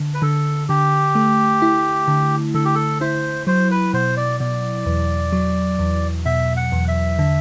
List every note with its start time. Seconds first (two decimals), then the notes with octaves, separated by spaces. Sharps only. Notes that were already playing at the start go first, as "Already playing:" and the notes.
Already playing: D3
0.14 B4
0.22 D3 A4
0.69 D3 G4
1.15 A3
1.62 E4
2.08 D3
2.54 D3 A4
2.65 G4
2.75 A4
3.01 E4 C5
3.47 F#3 C5
3.71 B4
3.94 B2 C5
4.17 D5
4.40 B2 D5
4.86 E2
5.32 F#3
5.79 E2
6.25 B2 E5
6.57 F#5
6.72 E2
6.88 E5
7.19 D3